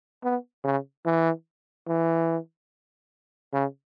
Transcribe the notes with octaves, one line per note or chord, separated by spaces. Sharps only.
B3
C#3
E3
E3
C#3